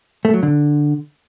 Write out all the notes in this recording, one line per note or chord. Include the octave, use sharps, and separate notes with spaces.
A3
F#3
D3